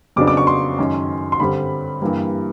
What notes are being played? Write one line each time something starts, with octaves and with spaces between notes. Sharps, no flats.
F2 C#3 F#3 B3 D4 D6
D6
C#6
C6
F#2 D#3 G#3 C#4
C6
G2 D3 G3 C4 B5
G2 E3 G3 A#3